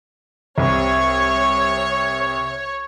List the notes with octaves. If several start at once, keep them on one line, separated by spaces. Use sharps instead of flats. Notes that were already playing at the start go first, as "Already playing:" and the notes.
C2 C3 C#5